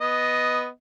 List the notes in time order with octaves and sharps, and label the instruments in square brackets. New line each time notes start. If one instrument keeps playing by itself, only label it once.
[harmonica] B3 D#5